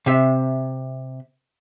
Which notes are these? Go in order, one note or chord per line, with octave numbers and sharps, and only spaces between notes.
C3 E5